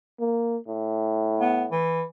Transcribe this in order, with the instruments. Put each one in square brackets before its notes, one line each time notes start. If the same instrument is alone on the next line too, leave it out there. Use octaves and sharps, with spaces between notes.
[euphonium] A#3
A2
[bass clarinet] B3
E3